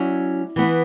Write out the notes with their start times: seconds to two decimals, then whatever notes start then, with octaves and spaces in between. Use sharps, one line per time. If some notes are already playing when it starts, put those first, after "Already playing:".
Already playing: F#3 C#4 E4 D5
0.56 E3 B3 E4